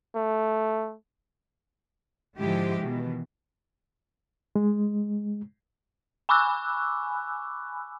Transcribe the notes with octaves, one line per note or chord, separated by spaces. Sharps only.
A3
G#2 D3 F3 G#3 E4 G4
B2 D#3 E3
G#3
G#5 B5 C#6 D6 E6 F#6